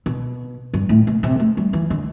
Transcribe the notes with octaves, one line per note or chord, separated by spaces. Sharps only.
B2
G2
A2
B2
C3
A3
G3
E3
D3